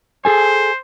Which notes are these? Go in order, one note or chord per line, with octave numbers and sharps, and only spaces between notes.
G#4 A4 C5 G#5